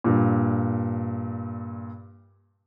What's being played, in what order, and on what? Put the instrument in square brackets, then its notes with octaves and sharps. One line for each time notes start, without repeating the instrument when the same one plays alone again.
[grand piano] G2 A#2